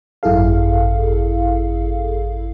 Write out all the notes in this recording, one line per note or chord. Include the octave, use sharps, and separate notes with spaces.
G#1 F#2 E4 G#4 A4 F5